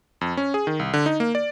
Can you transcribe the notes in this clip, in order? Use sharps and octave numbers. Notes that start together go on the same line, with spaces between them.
F2
C#4
G#4
D#3
C2
D3
D#4
A#3
D5